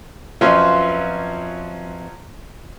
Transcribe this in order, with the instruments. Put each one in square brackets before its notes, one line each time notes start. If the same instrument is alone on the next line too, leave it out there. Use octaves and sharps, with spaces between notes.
[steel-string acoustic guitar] F2 B4 E5 [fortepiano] F3 F#3 C#4 [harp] F4